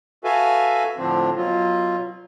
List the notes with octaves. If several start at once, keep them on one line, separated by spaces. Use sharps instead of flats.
F#4 A4 B4 E5 F5 G#5
A2 D3 F3 C4 D4
B2 F#3 F4